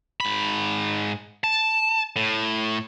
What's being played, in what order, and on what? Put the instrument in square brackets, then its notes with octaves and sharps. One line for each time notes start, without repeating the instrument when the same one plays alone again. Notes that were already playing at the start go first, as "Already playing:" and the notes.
[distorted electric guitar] G#2 B5
A5
A2